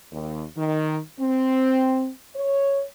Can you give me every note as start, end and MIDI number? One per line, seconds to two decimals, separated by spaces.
0.12 0.43 39
0.57 0.98 51
1.20 2.10 60
2.35 2.83 73